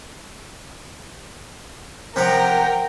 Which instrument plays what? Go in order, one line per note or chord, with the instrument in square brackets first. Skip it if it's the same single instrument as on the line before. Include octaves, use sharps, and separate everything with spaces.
[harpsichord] C3 F3 F#5 [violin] A#4 G5